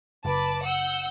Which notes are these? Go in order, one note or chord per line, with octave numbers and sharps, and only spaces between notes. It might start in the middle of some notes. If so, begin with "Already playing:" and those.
F#1 B4 A5 D6
F#5 E6 G6